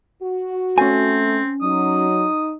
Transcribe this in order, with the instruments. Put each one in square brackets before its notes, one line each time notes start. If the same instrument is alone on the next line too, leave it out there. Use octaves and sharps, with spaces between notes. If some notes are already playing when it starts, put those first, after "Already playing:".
[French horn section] F#4
[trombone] A3 [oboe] C4 [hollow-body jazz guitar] C#4 G#5
[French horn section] F#3 [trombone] D#4 [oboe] D#6